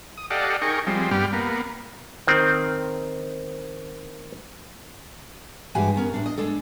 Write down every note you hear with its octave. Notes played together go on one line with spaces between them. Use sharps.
D#6
G4 A4 D5 D#5 F5 F#5
D#4 G#4 A#4 G5 C#6
F3 G3 G#3 C4
G2 G3 B3 G4 F6
A#3 B3
D#3 C4
G2 E3 G#3 F#4 G4 G#5
B3 C#4 A#4
A2 D4
D#5
G#3 D4 A4